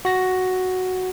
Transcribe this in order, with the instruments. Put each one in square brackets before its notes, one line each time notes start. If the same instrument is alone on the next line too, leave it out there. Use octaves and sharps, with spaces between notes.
[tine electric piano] F#4 A#6